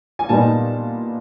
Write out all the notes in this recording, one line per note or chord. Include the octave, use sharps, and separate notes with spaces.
G#5
A#2 G3 B3 D#4 A5